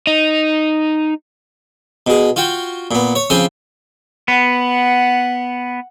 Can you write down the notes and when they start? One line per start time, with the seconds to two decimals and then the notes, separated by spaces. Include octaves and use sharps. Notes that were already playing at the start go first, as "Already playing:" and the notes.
0.07 D#4
2.07 B2 G#4
2.36 F4 F#4 G5
2.91 A#2 B3
3.15 C#5
3.30 C#3 F3 C4 G#5 C6
4.28 B3 F#5